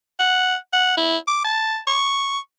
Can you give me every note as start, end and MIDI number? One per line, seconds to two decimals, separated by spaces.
0.20 0.55 78
0.73 0.97 78
0.97 1.18 64
1.27 1.42 86
1.45 1.78 81
1.87 2.39 85